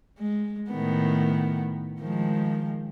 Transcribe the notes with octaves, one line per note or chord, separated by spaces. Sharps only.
G#3
A2 D#3 B3
D#3 F3 G#3